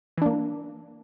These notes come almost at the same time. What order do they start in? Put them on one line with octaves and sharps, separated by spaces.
E3 D4 A#3